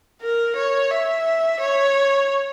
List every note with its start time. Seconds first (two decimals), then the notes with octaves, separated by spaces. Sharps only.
0.22 A#4
0.56 C#5
0.91 E5
1.60 C#5